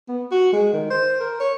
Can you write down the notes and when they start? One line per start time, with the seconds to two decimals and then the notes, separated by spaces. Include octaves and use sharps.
0.08 B3
0.31 F#4
0.53 G#3
0.73 D#3
0.90 C5
1.20 A#4
1.40 C#5